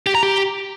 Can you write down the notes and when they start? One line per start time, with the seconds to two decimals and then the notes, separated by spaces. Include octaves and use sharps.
0.07 G4
0.15 A#5
0.23 G4